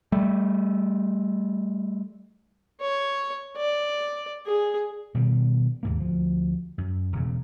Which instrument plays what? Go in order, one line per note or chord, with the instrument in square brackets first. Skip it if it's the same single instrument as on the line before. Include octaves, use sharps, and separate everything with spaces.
[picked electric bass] G3 A3
[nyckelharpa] C#5
D5
G#4
[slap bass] B2 D#3 G3
D#2 G#2 A#3
D2 F3
F#2
E1 C#3